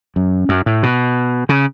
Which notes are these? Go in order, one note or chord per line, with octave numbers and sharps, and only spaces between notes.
F#2
F#2
A2
B2
C#3